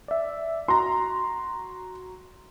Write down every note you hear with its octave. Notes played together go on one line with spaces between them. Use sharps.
D5 E5
F#4 A#5 C6